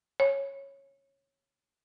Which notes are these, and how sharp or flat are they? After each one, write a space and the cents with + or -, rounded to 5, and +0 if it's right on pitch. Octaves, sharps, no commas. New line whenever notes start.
C#5 -15